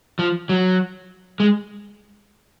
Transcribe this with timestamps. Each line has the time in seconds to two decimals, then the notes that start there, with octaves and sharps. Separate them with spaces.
0.19 F3
0.49 F#3
1.40 G#3